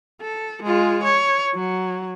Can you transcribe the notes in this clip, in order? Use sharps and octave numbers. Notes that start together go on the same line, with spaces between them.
A4
G#3 F4
C#5
F#3